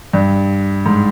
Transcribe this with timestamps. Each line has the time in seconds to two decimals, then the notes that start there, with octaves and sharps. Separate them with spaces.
0.13 G2
0.86 G#2